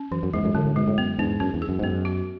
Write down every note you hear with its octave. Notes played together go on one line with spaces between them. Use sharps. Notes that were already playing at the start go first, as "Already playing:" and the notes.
Already playing: C#4
F#2 E3
F#2
E2 G#2 G#3
F#2 A2
F#2 A2 D3
F#2 A2
G#2 B2 G#3
F#2 A2
F#2 B3
E2 G#2 D4
F#2 C#4
E2
G#4
F#2
G#2
F#2 B3
F#4